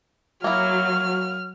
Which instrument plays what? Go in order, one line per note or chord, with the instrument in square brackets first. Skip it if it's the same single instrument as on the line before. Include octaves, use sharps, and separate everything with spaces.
[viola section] F#3 [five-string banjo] A#3 E4 [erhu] F6